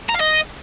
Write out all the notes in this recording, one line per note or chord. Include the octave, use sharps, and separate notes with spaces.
A#5
F5
D#5